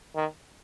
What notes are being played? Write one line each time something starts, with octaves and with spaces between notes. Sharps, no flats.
D#3